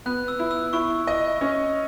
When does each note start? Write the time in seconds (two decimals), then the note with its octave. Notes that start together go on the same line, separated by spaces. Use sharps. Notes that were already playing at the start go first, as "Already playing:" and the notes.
0.06 B3 F#6
0.28 E6
0.39 E4
0.51 E6
0.73 E4 C#6
1.07 D#5
1.41 C#4